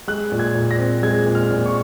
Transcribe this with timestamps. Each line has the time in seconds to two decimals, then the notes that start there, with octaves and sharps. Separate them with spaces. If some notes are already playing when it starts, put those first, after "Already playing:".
0.08 G#3 F#6
0.32 A#2
0.39 G#6
0.55 A#2
0.71 A#6
0.79 C4
1.03 G#3 G#6
1.26 A#2
1.35 F6
1.51 A#2
1.66 C#6